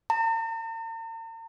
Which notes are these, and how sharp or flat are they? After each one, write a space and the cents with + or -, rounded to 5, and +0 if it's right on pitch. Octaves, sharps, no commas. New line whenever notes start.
A#5 -45